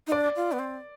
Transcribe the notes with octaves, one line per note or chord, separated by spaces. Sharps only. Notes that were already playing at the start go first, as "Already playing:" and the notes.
D#4
D4 D5
F4
B3
C4